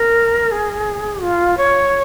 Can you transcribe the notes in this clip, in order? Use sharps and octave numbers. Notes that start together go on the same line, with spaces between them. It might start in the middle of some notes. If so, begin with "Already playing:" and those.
Already playing: A#4
G#4
F4
C#5